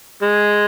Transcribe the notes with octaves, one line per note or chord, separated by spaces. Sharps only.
G#3